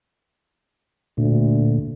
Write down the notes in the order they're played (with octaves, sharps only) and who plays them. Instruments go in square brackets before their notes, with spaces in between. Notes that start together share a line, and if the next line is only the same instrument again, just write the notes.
[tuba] D2 [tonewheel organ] A#2